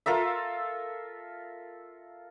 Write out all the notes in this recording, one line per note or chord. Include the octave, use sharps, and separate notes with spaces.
F4 A4 A#4 E5